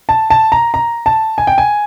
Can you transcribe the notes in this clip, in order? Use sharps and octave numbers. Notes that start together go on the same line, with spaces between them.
A5
A5
A#5
A#5
A5
G#5
G5
G#5